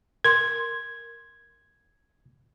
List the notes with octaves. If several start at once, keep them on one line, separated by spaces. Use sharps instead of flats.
A#4 C6 G#6